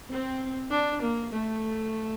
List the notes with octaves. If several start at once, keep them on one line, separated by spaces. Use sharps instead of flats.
C4
D4
A#3
A3